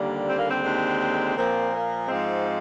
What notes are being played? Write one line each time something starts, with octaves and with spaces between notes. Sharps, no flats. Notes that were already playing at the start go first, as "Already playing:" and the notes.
Already playing: D#2 D3 G3 A#3
C4
A#3
C4
D#2 D3 G#3
A#2 F3 A#3 C4
A#3
G#2 F3 G#3 C4
C4